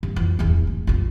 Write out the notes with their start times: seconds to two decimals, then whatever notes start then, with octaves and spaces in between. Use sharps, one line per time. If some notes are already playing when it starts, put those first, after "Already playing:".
0.03 G2
0.16 F2 E3
0.39 D1 E2
0.67 A3
0.87 A#1 F2